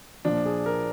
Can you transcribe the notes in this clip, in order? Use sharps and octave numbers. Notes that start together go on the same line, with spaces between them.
A#2 F3 D4
G#4
A#4